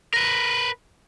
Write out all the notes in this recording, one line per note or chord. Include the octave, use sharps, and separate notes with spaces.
A#4 B4